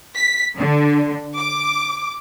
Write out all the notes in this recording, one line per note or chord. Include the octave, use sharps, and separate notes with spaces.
B6
D3
D6